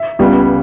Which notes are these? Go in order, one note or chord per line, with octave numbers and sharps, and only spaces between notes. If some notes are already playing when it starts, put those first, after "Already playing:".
Already playing: E5
C#2 C#3 G3 B3